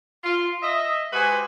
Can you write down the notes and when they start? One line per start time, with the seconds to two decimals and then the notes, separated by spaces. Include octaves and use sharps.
0.24 F4
0.63 D#5 E5
1.13 G#3 F#4 G4 B4 C5 G#5